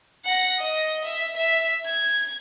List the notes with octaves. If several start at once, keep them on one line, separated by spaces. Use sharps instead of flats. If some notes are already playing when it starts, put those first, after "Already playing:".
F#5 A#6
D#5
E5
E5
G#6